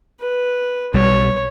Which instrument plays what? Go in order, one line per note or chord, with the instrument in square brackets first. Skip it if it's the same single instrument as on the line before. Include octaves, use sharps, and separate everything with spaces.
[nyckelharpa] B4
[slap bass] B1 G3 [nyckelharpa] C#5